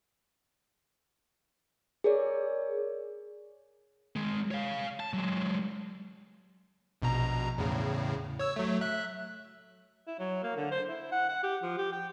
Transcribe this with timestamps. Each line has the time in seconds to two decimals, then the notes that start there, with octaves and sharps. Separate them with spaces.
2.04 G#4 A#4 C#5 D5
4.16 D#3 G#3
4.51 C#5 F5
5.00 A5
5.13 F#3 G#3
7.02 A#1 B2 A#5
7.58 E2 A2 C#3
8.39 C#5 E6
8.56 F#3 A3
8.81 E5 F#6
10.07 E4
10.19 F#3
10.43 A#3
10.56 D3
10.71 C5
10.88 E4
11.12 F#5
11.29 F#5
11.43 G4
11.63 F3
11.78 G4
11.92 G5